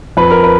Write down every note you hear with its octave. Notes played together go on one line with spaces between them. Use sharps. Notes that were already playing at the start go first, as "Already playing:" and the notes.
F2 B4
A#4
B4